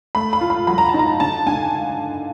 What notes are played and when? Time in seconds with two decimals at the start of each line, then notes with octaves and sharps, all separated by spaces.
0.15 A3 B5
0.33 B5
0.41 F4
0.50 B5
0.67 F#3 B5
0.78 A#5
0.89 A5
0.94 D#4
0.99 A#5
1.20 D3 A5
1.47 D3 G#5